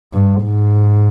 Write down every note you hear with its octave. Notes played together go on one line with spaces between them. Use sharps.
G2
G#2